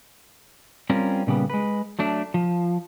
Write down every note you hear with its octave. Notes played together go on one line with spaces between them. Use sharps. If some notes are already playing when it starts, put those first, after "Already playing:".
G3 C4 C#4 F4 A#4
A#2 C#3 G3 B3
G#3 B4
F#3 A3 D4
F3